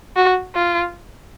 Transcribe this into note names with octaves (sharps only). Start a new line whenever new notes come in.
F#4
F4